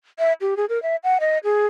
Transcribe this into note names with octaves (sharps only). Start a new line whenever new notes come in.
E5
G4
G#4
A#4
E5
F#5
D#5
G#4